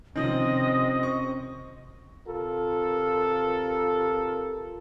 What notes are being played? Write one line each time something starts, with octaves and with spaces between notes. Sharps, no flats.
C3 D#3 F3 C4 C#4 D#5
C#6
C3 F4 A4 A#4